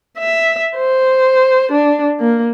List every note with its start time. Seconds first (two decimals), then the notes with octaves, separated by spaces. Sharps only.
0.18 E5
0.77 C5
1.72 D4
2.20 A#3